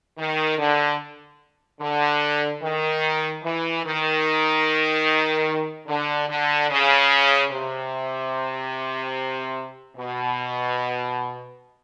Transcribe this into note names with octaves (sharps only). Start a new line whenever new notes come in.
D#3
D3
D3
D#3
E3
D#3
D3
D3
C#3
C3
B2